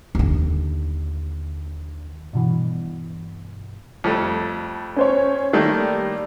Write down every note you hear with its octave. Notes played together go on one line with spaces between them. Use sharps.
D#2 D3
G2 B2 E3
F2 G3 A3
C#4 C5 C#5
D#3 G3 A3 A#3